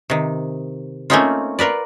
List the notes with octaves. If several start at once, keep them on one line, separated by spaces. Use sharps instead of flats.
C3 D#3
A3 A#3 C4 C#4 D#4 F4
F4 A#4 B4 D5